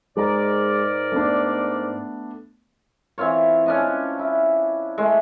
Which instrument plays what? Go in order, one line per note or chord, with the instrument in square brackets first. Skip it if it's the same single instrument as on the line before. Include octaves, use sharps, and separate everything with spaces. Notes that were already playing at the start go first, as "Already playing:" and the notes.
[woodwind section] G#2 A#4 D5 [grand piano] G#3 A#5
[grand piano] A3 B3 D4
[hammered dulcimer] E3 C4 F4 C#5
C#4 D4 D#5
E4
G#3 A3